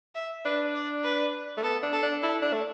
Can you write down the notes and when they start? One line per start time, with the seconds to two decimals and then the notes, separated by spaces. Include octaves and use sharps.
0.15 E5
0.45 D4 B4
0.74 D5
1.04 B4
1.57 A3
1.63 B3 A4
1.83 D4
1.93 A4
2.03 D4
2.22 E4 A4
2.42 D4
2.53 A3